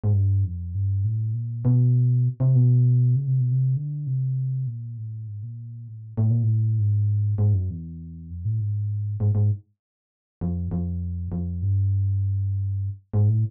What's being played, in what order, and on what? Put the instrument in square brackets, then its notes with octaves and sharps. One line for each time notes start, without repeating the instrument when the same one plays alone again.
[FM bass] G#2
G2
F2
G2
A2
A#2
B2
C3
B2
C#3
C3
B2
C3
D3
C3
A#2
A2
G#2
A#2
A2
A2
A#2
A2
G#2
G#2
F#2
E2
F2
A2
G#2
G#2
G#2
F2
F2
F2
G2
G#2
A2